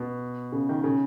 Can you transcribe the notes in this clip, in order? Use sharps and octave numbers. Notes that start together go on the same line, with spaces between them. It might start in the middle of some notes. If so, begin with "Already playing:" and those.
Already playing: B2
C#3
D#3
C#3